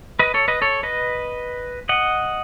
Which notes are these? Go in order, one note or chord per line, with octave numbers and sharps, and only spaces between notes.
B4 D#5
A4 C#5
B4 D#5
A4 C#5
B4 D#5
D#5 F#5